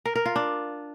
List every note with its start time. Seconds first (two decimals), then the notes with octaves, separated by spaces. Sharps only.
0.05 A#4
0.15 A#4
0.26 F4
0.36 D4